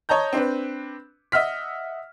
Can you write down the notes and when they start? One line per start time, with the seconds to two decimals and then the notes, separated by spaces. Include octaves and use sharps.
0.09 C#5 D#5 A5 A#5 G6
0.33 C4 D4 B4
1.32 D#5 E5 F#5 F6 B6